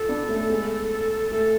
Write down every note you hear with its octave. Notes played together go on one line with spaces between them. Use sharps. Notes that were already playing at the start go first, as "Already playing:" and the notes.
Already playing: F4 A4
B3 D4
D4
A3 C#4
G#3 B3
A3 A4